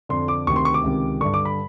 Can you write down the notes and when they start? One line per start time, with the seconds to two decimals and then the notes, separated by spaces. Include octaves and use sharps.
0.09 F2 D3 C6
0.28 D6
0.47 D2 C3 D#3 C#6
0.56 C6
0.65 C#6
0.74 D6
0.84 C#2 C3 D#3
1.21 G2 D3 C#6
1.34 D6
1.45 B5